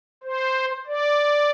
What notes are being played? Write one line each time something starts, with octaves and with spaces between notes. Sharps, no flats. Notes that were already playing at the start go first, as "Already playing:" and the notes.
C5
D5